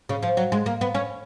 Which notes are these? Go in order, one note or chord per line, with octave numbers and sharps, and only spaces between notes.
C#3
F3
F#3
G#3
A#3
B3
C#4